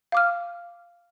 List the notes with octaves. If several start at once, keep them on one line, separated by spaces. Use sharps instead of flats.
F5 D6 F6